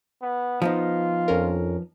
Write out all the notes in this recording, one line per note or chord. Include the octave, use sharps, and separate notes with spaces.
B3
F3 B3 D#4 F4
F2 C#4 A#4